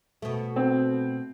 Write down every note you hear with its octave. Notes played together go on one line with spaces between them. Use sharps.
B2 A3
C4